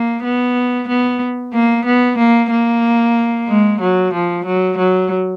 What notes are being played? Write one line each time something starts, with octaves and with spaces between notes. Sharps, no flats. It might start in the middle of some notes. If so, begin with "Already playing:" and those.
Already playing: A#3
B3
B3
A#3
B3
A#3
A#3
G#3
F#3
F3
F#3
F#3